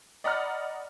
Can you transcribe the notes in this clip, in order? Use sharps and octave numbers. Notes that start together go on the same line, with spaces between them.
D5 D#5 F#5 A#5 B5 F6